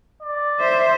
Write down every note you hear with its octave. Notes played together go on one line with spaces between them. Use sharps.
D5
C5 E5